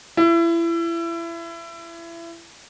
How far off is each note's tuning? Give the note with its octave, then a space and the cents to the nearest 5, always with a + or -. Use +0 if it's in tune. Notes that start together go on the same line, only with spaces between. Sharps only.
E4 +30